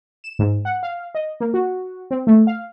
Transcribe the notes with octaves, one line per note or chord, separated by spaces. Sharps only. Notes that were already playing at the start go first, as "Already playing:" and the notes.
E7
G#2
F#5
F5
D#5
A#3
F#4
C4
A3
F5